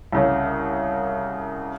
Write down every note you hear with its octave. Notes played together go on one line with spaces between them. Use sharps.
C2 C#3